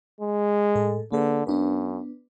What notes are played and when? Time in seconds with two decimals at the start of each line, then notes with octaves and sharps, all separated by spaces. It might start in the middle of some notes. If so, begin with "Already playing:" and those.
0.21 G#3
0.75 A2 A4
1.12 D3 A#3 G#4 B4
1.47 F#2 B3 D4 B4